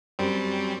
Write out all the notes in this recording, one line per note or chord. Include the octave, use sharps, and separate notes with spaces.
F#2 G3 C4